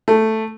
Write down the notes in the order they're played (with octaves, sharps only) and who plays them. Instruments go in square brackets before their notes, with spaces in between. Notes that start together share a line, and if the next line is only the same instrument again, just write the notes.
[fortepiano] A3